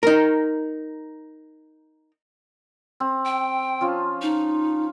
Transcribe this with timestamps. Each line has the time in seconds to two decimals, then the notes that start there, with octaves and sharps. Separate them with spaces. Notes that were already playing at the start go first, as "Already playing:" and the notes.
0.03 D#4 A#4
3.00 C4
3.26 G5
3.81 F3 C#4 F4
4.22 D#4